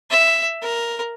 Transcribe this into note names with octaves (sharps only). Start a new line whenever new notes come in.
E5
A#4